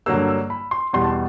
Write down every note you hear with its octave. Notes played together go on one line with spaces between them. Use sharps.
G2 D3 F#3 A#3 E6
E6
B5
C6
E2 B2 G3 C6
A5